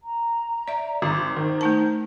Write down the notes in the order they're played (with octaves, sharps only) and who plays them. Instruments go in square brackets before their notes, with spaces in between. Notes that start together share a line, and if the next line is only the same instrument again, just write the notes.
[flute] A#5
[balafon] D5 E5
[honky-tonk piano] G#1 [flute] D6
[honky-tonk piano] D#3 [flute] C5
[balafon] A3 D#4 A5